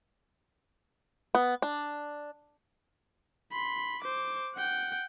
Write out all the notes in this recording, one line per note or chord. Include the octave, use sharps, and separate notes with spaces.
B3
D4
B5 C6
C5 D6
F#5 G5